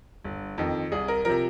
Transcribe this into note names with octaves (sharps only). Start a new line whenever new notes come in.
G1
F2 D#3
C2 G#4
A#4
C3 F3 A#4